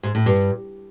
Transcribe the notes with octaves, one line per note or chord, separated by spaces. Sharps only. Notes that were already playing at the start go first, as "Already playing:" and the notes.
G#2
A2
G2